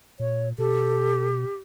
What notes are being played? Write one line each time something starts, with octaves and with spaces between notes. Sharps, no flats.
A#2 C#5
B2 G4 A4